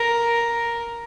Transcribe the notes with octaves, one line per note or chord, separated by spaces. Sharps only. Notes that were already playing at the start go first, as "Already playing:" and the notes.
Already playing: A#4